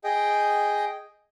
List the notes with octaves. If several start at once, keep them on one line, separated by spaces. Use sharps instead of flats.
G#4 D#5 G5